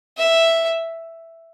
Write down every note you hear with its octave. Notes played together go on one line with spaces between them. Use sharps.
E5